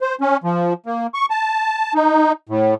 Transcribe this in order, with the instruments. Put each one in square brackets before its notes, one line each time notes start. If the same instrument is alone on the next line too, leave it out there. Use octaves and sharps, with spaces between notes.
[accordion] C5
C#4
F3
A#3
C#6
A5
D#4
A2